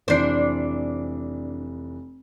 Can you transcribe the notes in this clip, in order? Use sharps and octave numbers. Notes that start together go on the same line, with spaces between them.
F1 E3 D4 C5 C7